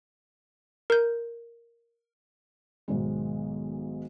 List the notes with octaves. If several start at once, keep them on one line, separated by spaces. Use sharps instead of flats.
A#4 G6
B1 G#2 D#3 G#3